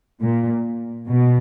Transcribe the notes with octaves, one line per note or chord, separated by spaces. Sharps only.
A#2
B2